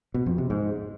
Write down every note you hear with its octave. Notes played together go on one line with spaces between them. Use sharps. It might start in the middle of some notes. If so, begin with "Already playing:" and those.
B2
F2
C3
G#2